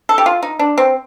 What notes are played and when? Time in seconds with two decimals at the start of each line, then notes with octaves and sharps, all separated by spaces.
0.09 A4
0.18 G4
0.26 F4
0.43 D#4
0.59 D4
0.78 C4